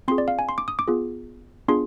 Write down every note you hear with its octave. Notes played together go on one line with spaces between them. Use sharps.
C4 F4 G#4 C6
D5
F5
G#5
C6
D6
D#6
D6
B3 F4 G#4
B3 D4 F4 G#4 C6